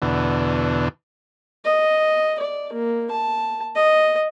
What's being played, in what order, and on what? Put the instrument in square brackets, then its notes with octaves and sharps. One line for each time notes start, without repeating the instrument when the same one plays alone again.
[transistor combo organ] E2 B2 D3
[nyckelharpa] D#5
D5
A#3
A5
D#5